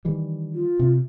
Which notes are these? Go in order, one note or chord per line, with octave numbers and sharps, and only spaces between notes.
D#3 E3 G3
F4
C3